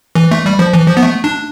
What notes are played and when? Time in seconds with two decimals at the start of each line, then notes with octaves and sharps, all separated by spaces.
0.15 E3
0.31 A3
0.46 G3
0.59 F3
0.73 E3
0.87 F3
0.97 B3
1.03 A3
1.24 D4